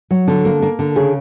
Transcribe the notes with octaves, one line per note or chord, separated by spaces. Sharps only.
F#3
D3 A4
A#3
A#3
D3
C#3 G#4